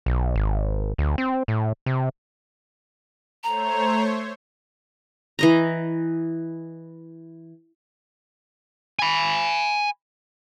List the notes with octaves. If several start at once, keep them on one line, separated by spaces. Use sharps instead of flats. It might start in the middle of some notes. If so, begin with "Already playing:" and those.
B1
G#1
D2
C4
A2
C3
A3 C5 C#5 A#5
E3 D#5 A#5
G#5 B5